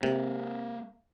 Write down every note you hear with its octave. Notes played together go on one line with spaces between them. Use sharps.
C3 G#3 A#3